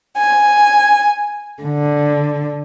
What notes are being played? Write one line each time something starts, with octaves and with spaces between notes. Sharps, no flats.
G#5
D3